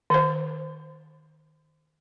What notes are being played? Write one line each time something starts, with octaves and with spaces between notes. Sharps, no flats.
D#3 C5